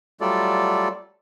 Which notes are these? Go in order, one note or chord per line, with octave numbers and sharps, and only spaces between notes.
F#3 G3 A3 F4 A4 D5